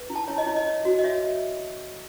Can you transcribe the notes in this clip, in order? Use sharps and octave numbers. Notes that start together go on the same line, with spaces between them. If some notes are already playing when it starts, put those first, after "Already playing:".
Already playing: B4
E4
A5
E4 C#5
D#5
E4 C#5
D#5
C#5
F#4
D#5
C#5 E5